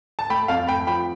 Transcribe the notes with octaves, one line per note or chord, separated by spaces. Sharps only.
A5
A3 G5 B5
F2 F5 A5
A3 G5 B5
F3 G5 B5